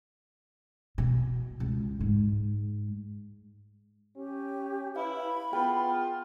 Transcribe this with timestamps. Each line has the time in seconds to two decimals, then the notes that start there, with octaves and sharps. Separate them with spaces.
0.98 B2
1.60 C#2
2.00 G#2 G#3
4.16 C#4 G4
4.96 E4 B4 F5 B5
5.53 B3 F4 G#4 G5